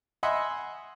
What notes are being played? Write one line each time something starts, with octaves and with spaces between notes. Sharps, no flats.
D#5 E5 F#5 G#5 B5 C6